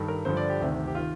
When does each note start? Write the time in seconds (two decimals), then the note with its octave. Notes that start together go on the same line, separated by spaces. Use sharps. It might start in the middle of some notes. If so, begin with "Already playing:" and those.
Already playing: G2 D#3 A4
0.08 A#4
0.25 G2 D3 F3 C5
0.37 D5
0.50 G4
0.60 D2 C3 D#3
0.87 G4
0.95 D#3 F4